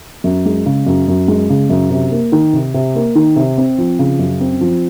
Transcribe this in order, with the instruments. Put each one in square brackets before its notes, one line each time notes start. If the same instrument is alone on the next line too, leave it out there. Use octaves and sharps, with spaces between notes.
[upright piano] F#2
G#3
C#3
F#2
F#2
G#3
C#3
F#2
C3
A#3
D#3
C3
C3
A#3
D#3
C3
C4
F3
C#3
F#2
C4
F3